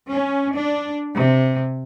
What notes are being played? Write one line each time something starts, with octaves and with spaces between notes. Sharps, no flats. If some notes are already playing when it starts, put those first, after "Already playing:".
C#4
D4
C3